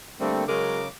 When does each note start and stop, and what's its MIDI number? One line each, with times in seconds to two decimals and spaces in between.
0.20 0.44 50
0.20 0.44 55
0.20 0.44 57
0.20 0.44 58
0.20 0.44 60
0.48 0.88 49
0.48 0.84 54
0.48 0.84 56
0.48 0.84 70
0.48 0.88 86